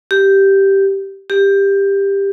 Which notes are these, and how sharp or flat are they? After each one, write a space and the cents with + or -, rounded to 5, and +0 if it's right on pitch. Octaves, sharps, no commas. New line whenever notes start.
G4 -5
G4 +15